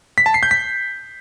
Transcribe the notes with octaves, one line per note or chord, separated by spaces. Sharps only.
B6
A5
C7
G6
B6